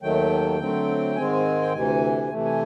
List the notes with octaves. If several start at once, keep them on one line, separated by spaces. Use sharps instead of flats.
D#2 D#3 F#3 A3 G5
D3 F#3 A3 C4
G#2 D#3 G#3 C4 G#5
G5
D2 C3 E3 G#5
C3 E3 A3
G#5